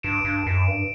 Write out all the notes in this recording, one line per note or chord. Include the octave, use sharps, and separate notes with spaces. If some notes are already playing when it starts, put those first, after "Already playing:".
G2 D7 E7
G2
F#2
G2